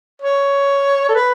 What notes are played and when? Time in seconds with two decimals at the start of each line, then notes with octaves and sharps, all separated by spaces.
0.22 C#5
1.09 A4
1.15 B4